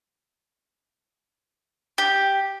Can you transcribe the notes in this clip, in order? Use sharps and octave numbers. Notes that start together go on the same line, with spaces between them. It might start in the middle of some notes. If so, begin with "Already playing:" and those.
G4